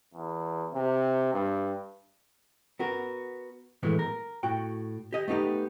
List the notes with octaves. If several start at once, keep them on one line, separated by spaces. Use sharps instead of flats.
E2
C3
G2
B3 F#4 A#4
A2 E3 F#3 G#3 A3 B3
A#4
A2 F#4 G5
G4 D#5
A3 B3 D#4 G4